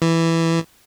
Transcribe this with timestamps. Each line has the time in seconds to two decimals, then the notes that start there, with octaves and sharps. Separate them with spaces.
0.02 E3